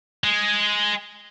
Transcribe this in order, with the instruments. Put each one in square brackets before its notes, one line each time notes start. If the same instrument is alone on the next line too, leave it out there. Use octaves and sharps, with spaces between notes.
[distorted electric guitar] G#3 G#4